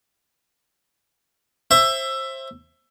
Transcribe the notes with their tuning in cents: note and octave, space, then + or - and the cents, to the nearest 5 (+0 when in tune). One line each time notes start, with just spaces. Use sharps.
C5 +25 E5 +15